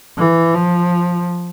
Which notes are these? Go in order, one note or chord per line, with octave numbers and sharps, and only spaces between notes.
E3
F3